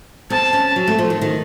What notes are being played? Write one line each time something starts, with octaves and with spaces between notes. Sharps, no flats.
C4 A5
C#4
F#3
A3
F3
D#3
D#3